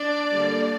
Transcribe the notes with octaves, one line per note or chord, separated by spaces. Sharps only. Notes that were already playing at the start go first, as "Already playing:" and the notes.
Already playing: D4 D5
D3 G3 A#3 D4